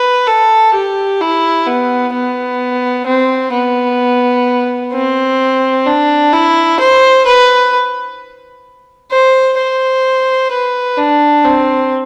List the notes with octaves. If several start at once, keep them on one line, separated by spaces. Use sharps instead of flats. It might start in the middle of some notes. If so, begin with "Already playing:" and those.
Already playing: B4
A4
G4
E4
B3
B3
C4
B3
C4
D4
E4
C5
B4
C5
C5
B4
D4
C4